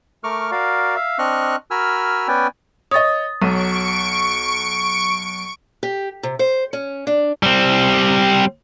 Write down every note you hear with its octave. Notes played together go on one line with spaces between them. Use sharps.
A3 A#4 C#6 D6 F6
F#4 A#4 D5 F5
E5 F5
C4 D4 D#5 C#6 F6 F#6
F#4 A#4 G#5 B5 E6 F6
B3 C#4 B4 D5 G5 G#5
C#5 D#5 D#6 A6
B1 F#3 C#6 D7 D#7
G4
C3
C5
C#4
D4
G3 C4